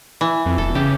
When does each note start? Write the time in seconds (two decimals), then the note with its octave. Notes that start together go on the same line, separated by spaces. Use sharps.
0.21 E3
0.46 F2
0.58 E1 A4
0.75 C#3 G4